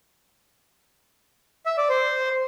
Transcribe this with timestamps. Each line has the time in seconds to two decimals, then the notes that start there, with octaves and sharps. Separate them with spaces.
1.66 E5
1.78 D5
1.89 C5